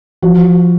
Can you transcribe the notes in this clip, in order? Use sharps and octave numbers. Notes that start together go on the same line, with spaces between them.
F3 F#4